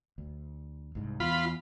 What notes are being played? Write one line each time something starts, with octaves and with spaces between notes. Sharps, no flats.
D2
C2 G#2
E2 F4 B5